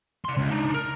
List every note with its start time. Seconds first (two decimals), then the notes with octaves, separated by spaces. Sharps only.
0.24 D5 C6
0.37 C#2
0.51 D4 D#4
0.74 A#4